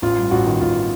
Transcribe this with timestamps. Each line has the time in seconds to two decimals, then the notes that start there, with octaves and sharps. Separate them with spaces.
0.02 A1 F4
0.18 G2
0.31 A1 F#4
0.46 D#3
0.61 A1 F4